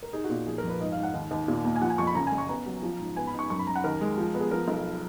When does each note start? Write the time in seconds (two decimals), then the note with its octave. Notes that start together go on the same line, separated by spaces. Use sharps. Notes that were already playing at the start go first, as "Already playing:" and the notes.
0.03 A#4
0.13 D#4 G#4
0.24 F#4
0.30 A#2
0.47 F3 G#4
0.58 A#4
0.64 F2
0.69 B4
0.80 G#2 D#5
0.92 F5
0.97 G#2
1.03 F#5
1.14 D#2
1.31 D#2
1.48 A#2
1.65 A#3
1.76 G#5
1.82 F3 F#5
1.90 G#5
1.98 F2 C#6
2.07 B5
2.15 F#1 A#5
2.27 G#5
2.32 F#1
2.38 C#6
2.49 B3 A#5
2.66 F#3
2.83 F3
2.99 G#2
3.16 B3 G#5
3.27 B5
3.33 D#4
3.39 C#6
3.50 F#2 C#6
3.59 B5
3.67 F#2 A#5
3.76 F#5
3.84 D#2 A#4
4.01 G#3
4.18 F3
4.34 B3
4.40 G#4
4.51 F3 A#4
4.68 B1